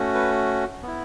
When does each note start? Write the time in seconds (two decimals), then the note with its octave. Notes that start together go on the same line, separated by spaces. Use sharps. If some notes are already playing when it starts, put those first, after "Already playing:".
Already playing: A3 C#4 F#4
0.14 B4
0.83 B3 E4